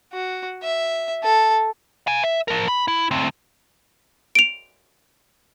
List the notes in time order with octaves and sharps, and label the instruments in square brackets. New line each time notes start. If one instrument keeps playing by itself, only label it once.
[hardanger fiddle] F#4
E5
A4
[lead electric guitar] F5 G#5
E5
F3 A#4
B5
E4
D2 C4
[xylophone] D7 F7